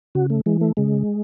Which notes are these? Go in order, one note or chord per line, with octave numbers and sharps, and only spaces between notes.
C#3 F#4
A3
E3 G#3
A3
C#3 G#3